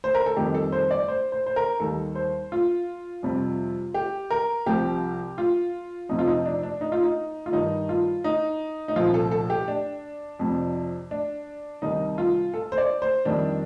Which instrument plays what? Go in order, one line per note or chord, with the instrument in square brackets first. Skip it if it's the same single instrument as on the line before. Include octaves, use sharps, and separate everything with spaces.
[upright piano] C5
A#4
A4
F2 D#3 G3 G4
A4
C5
D5
C5
C5
C5
A#4
D#2 D#3 G3 A4
C5
F4
F2 C3 G3
G4
A#4
C2 C3 F3 G4
F4
F2 C3 F3 D#4
F4
D#4
D4
D4
D#4
F4
D#4
F4
G2 D#3 G3 D#4
F4
D#4
D#4
C2 A#2 F3 F4
A4
A4
G4
D4
F2 C3 F3
D4
C2 C3 D#3 G3 D#4
F4
A4
C5
D5
C5
F2 D#3 G3 D4